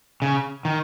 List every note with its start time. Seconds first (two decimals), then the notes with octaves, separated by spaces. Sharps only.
0.22 C#3
0.65 D#3